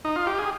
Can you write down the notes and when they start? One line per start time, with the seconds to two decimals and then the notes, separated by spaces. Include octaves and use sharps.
0.05 D#4
0.16 F4
0.27 G4
0.39 G#4